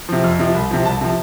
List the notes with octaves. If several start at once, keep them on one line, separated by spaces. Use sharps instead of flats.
C3 F3
F2
C3 F3
C2
C3 F3
C2 A5
C3 F3